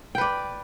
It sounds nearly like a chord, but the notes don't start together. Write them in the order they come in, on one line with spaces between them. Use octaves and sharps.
G5 B4 D5